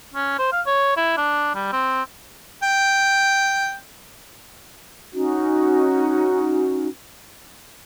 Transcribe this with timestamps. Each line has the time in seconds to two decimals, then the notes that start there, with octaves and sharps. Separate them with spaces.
0.14 C#4
0.38 C5
0.52 F5
0.66 C#5
0.97 E4
1.17 D4
1.55 G3
1.72 C4
2.63 G5
5.13 C#4 D#4 F#4